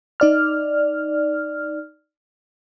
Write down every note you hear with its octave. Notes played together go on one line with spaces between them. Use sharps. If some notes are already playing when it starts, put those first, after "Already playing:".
D#4 D5 F6